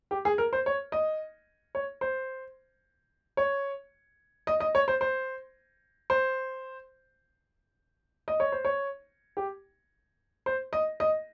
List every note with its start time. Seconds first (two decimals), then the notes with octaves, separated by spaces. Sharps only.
0.11 G4
0.25 G#4
0.38 A#4
0.53 C5
0.66 C#5
0.92 D#5
1.75 C#5
2.01 C5
3.37 C#5
4.47 D#5
4.60 D#5
4.75 C#5
4.88 C5
5.01 C5
6.10 C5
8.28 D#5
8.40 C#5
8.52 C5
8.65 C#5
9.37 G4
10.46 C5
10.73 D#5
11.00 D#5